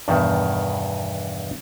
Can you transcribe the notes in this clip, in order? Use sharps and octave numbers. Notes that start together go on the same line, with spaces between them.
E2 G2 B2 D#3